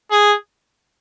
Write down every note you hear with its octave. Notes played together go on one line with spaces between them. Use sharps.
G#4